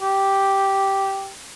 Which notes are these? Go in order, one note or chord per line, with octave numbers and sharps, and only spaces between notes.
G4